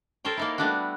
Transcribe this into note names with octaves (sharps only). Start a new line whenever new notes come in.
A4 A#4 C5 C#5 G5
A#3 D#4 E4
G3 A3 B3 D4 E4 F#4